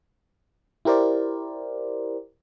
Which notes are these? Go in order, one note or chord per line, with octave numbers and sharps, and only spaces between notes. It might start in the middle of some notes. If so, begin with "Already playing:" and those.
E4 G4 A#4 C5 D5